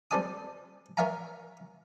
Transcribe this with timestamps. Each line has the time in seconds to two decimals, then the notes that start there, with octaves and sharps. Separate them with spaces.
0.11 G3 C4 A4 D5 G#5 D#6
0.97 A#4 C#5 E5 F5 G#5 A#5